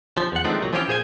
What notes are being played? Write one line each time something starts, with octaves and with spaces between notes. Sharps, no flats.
F3
E2 F#5
D#3 F3 G#3 A3 C4 D4
C2 A#2 F#3
E3 F3 C4 C#4 F4 G4
A#2 G#4 C5 C#5 G#5